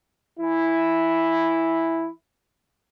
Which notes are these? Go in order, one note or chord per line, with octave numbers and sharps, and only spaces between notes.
E3 E4